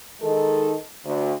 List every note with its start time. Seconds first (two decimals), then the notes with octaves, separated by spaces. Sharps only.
0.22 D#3 G#3 D#4 A4
1.05 D2